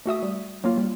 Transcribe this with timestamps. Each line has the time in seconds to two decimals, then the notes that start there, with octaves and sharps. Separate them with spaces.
0.06 A3 F#4 E5 D#6
0.23 G3
0.64 F#3 A#3 F4
0.78 G3